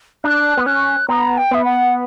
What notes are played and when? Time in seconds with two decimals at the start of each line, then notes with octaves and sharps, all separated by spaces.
0.24 D4 F#6
0.57 B3
0.66 C#4 F#6
1.08 B3 A#5
1.37 G5
1.51 B3 E5
1.65 F#5